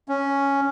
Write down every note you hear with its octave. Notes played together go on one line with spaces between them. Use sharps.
C#4